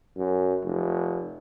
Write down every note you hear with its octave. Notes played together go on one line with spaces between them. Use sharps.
F#2
F1